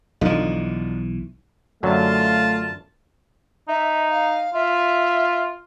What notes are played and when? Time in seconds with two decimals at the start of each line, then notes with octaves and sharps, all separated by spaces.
0.21 B1 D3 E3 F3 D#4
1.83 F#2 D3 F#3 A3 F4 F5 A5
3.68 D#4 E5
4.11 F5
4.54 F4 E5